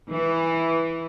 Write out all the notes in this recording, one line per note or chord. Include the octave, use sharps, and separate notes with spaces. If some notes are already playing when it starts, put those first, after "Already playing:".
E3